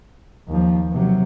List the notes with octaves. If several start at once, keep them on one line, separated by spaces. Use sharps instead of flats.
D#2 F3
C3 F#3